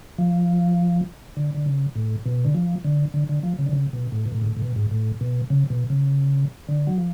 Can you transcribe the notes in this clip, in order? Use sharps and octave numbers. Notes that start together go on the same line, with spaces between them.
F3
D3
D3
C#3
A2
B2
D3
F3
D3
D3
D3
F3
C#3
D3
C#3
B2
A2
B2
A2
G#2
A2
A2
B2
G#2
A2
B2
C#3
B2
C#3
D3
F#3
F3